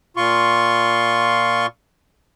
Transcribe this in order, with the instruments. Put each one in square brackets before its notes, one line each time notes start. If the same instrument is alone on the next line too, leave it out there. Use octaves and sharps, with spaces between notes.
[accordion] A#2 F4 C6 C#6